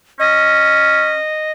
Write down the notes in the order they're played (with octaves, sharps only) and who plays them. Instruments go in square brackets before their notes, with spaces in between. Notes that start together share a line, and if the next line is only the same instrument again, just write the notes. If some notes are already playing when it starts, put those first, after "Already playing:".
[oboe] C#4 [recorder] D#5